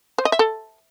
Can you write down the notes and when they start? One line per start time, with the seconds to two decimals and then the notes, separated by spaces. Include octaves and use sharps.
0.18 C5
0.25 D#5
0.32 E5
0.39 A4